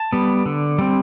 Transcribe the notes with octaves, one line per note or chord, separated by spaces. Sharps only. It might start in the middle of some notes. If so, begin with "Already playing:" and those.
Already playing: A5
G3 B3
D3
G3 C4